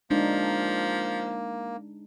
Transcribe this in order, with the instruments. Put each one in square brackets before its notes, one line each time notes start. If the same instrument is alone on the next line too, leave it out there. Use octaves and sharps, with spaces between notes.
[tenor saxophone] F3 [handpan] G#3 D4 D#4 [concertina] A#3